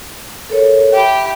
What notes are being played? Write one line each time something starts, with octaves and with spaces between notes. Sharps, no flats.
A4 A#4 C#5
G4 E5 B5